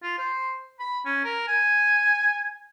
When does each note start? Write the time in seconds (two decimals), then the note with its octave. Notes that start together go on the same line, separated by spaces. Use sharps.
0.03 F4
0.18 C5
0.79 B5
1.06 C#4
1.24 A#4
1.47 G#5